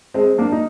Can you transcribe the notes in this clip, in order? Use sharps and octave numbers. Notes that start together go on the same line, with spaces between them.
G#3 C4
A#3 D4
D#4